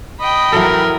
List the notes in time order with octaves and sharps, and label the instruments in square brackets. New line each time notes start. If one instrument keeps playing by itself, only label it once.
[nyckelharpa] D#5 [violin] G5 B5
[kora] E3 F#3 A4 [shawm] A#4